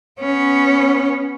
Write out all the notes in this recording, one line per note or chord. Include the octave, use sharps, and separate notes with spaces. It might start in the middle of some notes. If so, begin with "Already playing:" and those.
B3 C#4